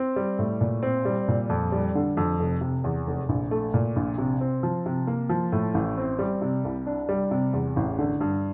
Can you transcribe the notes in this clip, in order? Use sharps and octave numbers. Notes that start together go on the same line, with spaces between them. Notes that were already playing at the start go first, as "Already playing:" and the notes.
Already playing: C4
G3
A2
A#2
C4
G3
A#2
F2
G3
D3
F2
F1
C3
E2
F1
A#1
A3
A#2
A#1
C3
C4
F3
C3
A#3
F3
A2
A1
C4
G3
C3
C2
D4
G3
C3
E2
A1
D3
G2